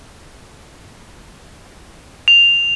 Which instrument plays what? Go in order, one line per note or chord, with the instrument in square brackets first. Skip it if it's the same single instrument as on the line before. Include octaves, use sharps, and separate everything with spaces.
[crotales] F7